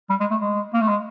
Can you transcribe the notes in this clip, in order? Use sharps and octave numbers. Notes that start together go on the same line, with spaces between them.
G3
G#3
A3
G#3
A#3
A3
G#3